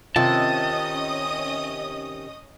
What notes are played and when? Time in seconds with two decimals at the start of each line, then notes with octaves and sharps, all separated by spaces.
0.16 C3 D#3 C#4 F4 D#5 A5 D#6